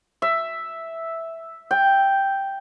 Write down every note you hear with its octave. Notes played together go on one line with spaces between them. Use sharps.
E5
G5